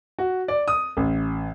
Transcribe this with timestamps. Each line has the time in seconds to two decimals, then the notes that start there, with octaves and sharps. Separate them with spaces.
0.19 F#4
0.48 D5
0.68 D#6
0.97 A1